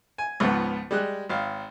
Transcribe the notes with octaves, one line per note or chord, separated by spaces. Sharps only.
G#5
C#2 G#2 F3 B3
G3 G#3 F#6
G#1 F5